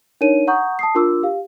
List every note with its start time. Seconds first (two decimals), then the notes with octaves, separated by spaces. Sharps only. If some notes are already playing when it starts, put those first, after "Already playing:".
0.21 D4 D#4 A#4 C#5 D#7
0.47 F#5 A#5 C#6 D#6 G6
0.79 A5 D#6 C7
0.95 D4 F4 A#4 C6 D6 E6
1.23 G4 F5